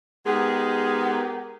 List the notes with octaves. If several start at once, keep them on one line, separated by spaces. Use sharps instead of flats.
G#3 B3 D#4 G4 G#4 A#4